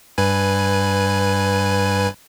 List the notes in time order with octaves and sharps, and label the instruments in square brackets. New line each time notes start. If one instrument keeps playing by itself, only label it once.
[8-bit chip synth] G2 B4 G#5